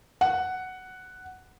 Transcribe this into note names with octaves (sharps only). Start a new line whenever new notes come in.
F#5